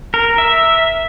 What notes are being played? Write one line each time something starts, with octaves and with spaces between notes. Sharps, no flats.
A#4
E5